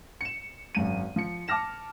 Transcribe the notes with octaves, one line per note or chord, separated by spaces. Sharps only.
C#7 E7
G#1 F#2 D#7
F3 C#7
A5 D6 F6 A#6 E7